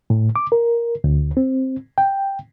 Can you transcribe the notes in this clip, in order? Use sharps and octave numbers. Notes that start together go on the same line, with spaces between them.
A2
D6
A#4
D2
C4
G5